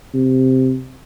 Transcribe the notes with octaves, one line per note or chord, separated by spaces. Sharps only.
C3